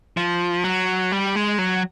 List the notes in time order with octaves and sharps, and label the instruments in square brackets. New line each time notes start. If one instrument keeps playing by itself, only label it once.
[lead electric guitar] F3
F#3
G3
G#3
F#3